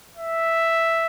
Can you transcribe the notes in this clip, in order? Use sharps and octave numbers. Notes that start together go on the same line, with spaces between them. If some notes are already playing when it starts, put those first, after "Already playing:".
E5